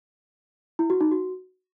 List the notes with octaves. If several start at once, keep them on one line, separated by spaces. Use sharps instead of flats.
E4
F#4
D#4
F#4